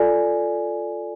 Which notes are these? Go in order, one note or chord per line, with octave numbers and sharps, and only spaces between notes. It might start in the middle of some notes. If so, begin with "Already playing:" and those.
Already playing: F4 A4 D5 G#5